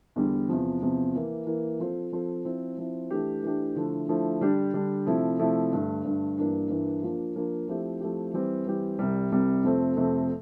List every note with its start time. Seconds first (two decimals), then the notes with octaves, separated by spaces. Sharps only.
0.16 E2 D3 G3
0.49 E2 C3 F3
0.81 E2 C3 F3
1.14 E3 A#3 E4
1.46 E3 A#3 E4
1.79 F3 C4 F4 A4 C5
2.12 F3 C4 F4 A4 C5
2.45 F3 C4 E4
2.77 F3 C4 E4
3.10 E3 A3 D4 G4
3.43 E3 A3 D4 G4
3.76 D3 F3 A3 E4
4.08 D3 F3 A3 E4
4.41 D3 G3 D4 G4
4.74 D3 G3 D4 G4
5.06 C3 F3 A3 E4
5.39 C3 F3 A3 E4
5.72 G2 D3 A3
6.04 G2 D3 A3
6.37 G2 E3 A#3 D4
6.70 G2 E3 A#3 D4
7.02 F3 A#3 D4 F4
7.36 F3 A#3 D4 F4
7.68 F3 A3 C4 E4 G4
8.00 F3 A3 C4 E4 G4
8.33 E3 G3 C4 G4
8.66 E3 G3 C4 G4
8.99 C2 C3 G3
9.32 C2 C3 G3
9.64 F2 C3 F3 A3 C4
9.97 F2 C3 F3 A3 C4